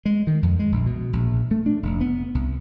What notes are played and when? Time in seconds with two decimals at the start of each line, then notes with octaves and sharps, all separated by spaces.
0.05 G#3
0.27 D#3
0.43 F2
0.59 G#3
0.72 A#1
0.86 B2
1.13 A#1
1.51 A3
1.66 D4
1.83 F1
2.01 B3
2.35 C2